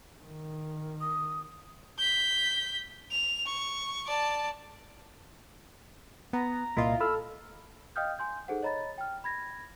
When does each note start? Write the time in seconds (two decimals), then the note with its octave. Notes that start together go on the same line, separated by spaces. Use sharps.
0.23 D#3
1.01 D#6
1.99 G6 B6
3.11 F7
3.46 C#6
4.06 D5 A5
6.33 B3 A#5
6.77 C2 A#2 E4 F4 D#5
7.00 A4 B5 E6 F6
7.96 D#5 F5 G5 D#6 F6 G6
8.19 G#5 C6 G6
8.48 D#4 G#4 A4 C5 F#5
8.62 C#5 D#5 A#5 B5 A6
8.98 G5 F6
9.24 B5 G#6 A#6